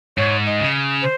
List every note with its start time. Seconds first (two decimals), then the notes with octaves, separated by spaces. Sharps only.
0.17 G#2 C#5
0.46 D#5
0.60 C#3
1.02 C5